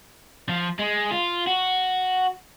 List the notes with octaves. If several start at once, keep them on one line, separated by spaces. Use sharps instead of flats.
F3
G#3
F4
F#4